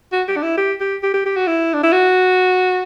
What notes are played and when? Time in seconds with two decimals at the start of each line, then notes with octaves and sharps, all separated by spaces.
0.13 F#4
0.28 G4
0.36 D4
0.43 E4
0.57 G4
0.80 G4
1.03 G4
1.14 G4
1.25 G4
1.36 F#4
1.47 E4
1.74 D4
1.83 E4
1.92 F#4